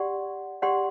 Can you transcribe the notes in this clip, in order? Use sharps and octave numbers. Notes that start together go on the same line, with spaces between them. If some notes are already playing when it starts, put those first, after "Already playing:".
Already playing: G4 D5 F#5 C6
G4 D5 F#5 C6